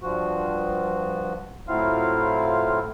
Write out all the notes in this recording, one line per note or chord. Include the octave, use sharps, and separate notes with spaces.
G2 F3 F#4
A2 F#3 C4 E4 F4 F5